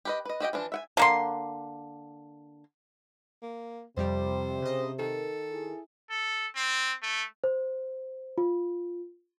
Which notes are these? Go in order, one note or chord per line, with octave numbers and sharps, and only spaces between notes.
G4 B4 D#5
B4 D#5
F#4 G4 D#5 G5
E3 F3 D4
E5 F#5 G#5
D3 A#3 C6
A#3
F2 C3 G3 G4 C5
C#3 D#5
D#3 A4
E4 G#4
A4
C4
A3
C5
F4